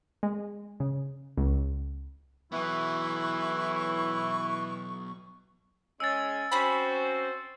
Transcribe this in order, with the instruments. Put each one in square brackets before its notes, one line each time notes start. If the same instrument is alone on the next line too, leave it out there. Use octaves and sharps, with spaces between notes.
[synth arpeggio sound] G#3
C#3
C#2
[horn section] E3 [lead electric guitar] F#3 B3 [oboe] E4 [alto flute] C#6
[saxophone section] G#3 C#4 [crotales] E6 A6
[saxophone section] C4 F#4 C5 [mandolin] C#4 B5